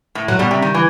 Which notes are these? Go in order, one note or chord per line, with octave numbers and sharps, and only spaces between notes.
A2
F#3
B2 G3
C3
D#3
E3